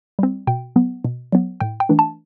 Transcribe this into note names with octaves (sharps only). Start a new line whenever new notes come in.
G3 C4
B2 G5
F#3 B3
B2
F#3 B3
A2 G5
G5
E3 A3 D4
A5